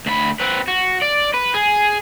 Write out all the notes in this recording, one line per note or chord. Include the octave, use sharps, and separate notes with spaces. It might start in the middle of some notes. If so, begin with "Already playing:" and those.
D2 B5
C4 B4
F#4
D5
B4
G#4